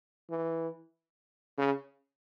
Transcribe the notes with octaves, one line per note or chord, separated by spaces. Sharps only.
E3
C#3